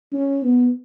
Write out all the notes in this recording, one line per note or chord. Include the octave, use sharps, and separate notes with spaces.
C#4
B3